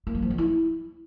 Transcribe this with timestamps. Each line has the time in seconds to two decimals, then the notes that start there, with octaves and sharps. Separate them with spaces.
0.07 A#3
0.15 F#3
0.22 F3
0.30 C4
0.38 E4